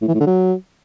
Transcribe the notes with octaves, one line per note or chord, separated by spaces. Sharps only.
A2
E3
A2
D3
F#3